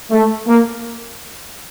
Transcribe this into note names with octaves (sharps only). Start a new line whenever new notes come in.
A3
A#3